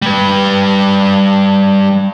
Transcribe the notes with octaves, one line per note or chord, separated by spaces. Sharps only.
G3 B4